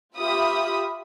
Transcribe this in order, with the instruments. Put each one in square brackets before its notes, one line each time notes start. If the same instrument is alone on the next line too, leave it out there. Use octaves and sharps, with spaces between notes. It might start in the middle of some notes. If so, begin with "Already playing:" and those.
[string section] F4 G4 E5 B5 D#6